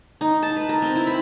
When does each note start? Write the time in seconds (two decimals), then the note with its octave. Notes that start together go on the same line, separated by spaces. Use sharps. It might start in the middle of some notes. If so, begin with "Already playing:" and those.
0.21 D#4
0.43 A5
0.56 B4
0.69 A#4
0.82 C4
0.96 E4
1.07 B5